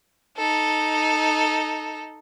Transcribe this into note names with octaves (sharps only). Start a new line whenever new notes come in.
D#4 A4